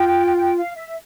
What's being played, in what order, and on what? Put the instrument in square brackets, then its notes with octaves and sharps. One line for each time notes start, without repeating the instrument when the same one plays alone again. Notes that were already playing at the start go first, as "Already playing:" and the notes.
Already playing: [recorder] F4 [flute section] G5
[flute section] G5
F5
E5